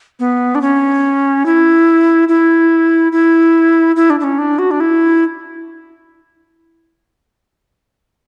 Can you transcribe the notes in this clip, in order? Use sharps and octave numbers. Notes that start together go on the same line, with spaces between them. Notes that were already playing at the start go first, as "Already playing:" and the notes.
B3
D4
C#4
E4
E4
E4
E4
D4
D4
C#4
D4
F#4
D4
E4